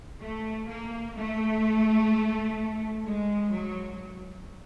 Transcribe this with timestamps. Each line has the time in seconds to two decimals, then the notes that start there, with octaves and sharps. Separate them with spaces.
0.21 A3
0.68 A#3
1.16 A3
3.05 G#3
3.52 F#3